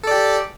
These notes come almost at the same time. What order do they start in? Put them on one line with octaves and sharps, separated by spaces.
A4 D5 G4